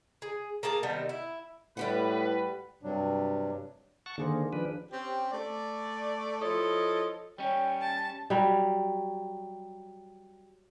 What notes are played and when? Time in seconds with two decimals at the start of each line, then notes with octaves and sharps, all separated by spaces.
0.22 G#4
0.63 A#3 G#4 A5 A#5
0.83 C3 D#3 G3 B3
1.09 E4
1.77 A2 G3 G4 B4 F#5
2.83 G2 C3 F#3 G3 D4
4.06 F#5 A5 C#6
4.18 D3 D#3 A#3 G#4 C5
4.53 F3 D4 B4
4.91 C4 C#4 G4
5.31 A3 D5
6.41 F3 E4 A4 C#5 D#5
7.38 G3 C#4 C#5 D#5 G5
7.81 A5
8.30 F#3 G3